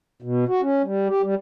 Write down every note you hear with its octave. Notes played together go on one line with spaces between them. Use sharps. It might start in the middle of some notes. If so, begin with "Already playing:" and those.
B2
F#4
C#4
G3
G4
G3